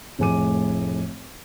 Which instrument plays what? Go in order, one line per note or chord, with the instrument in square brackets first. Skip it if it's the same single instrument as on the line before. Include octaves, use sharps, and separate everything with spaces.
[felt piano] F1 A2 G#4 G#5 D6 D#7